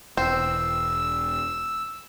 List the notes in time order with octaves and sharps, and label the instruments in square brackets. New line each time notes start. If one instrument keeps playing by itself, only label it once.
[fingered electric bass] E1 [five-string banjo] C4 [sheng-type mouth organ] E6